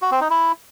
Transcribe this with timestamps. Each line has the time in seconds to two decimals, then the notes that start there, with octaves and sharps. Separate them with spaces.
0.02 F#4
0.11 C4
0.21 D#4
0.30 E4